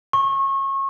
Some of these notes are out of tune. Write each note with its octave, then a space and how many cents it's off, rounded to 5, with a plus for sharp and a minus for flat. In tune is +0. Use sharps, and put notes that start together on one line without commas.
C#6 -30